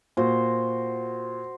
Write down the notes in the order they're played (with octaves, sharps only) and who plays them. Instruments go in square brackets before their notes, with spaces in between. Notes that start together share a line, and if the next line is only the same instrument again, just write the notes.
[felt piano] A#2 [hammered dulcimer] F#4 C5